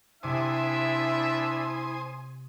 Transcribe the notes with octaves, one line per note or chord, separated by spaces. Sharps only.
C3 D4 E4 C5 E5 G#5 D6 D#6